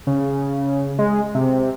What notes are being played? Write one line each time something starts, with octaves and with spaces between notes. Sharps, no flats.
C#3
G#3
C3